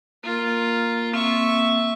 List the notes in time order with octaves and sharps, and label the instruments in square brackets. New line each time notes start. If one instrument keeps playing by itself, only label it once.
[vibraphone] A#3 [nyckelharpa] F4 A#4
[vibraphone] A#3 C4 [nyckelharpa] E5 C#6